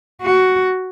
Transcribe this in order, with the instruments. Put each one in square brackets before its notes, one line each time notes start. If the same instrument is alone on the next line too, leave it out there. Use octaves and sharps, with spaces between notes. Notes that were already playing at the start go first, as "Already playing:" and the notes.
[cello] F#4